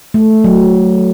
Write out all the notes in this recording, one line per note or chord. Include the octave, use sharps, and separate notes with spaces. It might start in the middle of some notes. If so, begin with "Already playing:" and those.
A3
F#3